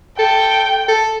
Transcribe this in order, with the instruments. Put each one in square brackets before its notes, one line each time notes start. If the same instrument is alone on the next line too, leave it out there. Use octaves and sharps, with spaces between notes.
[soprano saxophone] A4 [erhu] G5
[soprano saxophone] A4